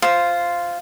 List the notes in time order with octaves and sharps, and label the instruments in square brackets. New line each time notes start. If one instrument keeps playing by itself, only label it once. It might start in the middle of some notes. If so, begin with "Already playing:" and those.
[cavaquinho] F4 C5